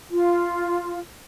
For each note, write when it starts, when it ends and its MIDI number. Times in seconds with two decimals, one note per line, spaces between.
0.11 0.99 65